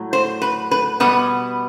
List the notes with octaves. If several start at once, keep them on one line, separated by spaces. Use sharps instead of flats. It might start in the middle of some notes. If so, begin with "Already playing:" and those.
Already playing: A2 F#3
C5
B4
B4
B2 G3 B3 B4